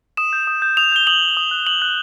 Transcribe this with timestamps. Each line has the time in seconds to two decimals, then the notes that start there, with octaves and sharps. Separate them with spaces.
0.17 D#6 E7
0.33 G6
0.47 D#6
0.62 G6
0.77 D#6 F7
0.92 G6 G7
1.07 D#6 F#7
1.21 G6
1.37 D#6
1.51 F#6
1.67 D#6 F#7
1.82 F#6